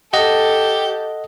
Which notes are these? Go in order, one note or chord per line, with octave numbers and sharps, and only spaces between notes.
G4 A4 D#5 F#5